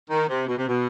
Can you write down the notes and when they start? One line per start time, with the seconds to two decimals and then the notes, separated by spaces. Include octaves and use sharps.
0.10 D#3
0.29 C3
0.48 B2
0.58 C3
0.67 B2